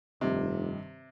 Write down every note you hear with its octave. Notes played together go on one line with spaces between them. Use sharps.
F1 G2 C3 D#3